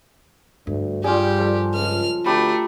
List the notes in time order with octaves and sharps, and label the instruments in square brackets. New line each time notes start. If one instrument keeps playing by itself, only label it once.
[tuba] D2 [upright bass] G2
[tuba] G3 [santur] F4 G#4 [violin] G4
[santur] F3 A4
[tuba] C#2 [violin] F6
[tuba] D2 [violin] A3 [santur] G4 A#5 B5